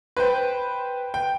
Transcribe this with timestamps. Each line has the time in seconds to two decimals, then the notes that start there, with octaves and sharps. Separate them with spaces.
0.17 B4 C5 G5
1.14 G5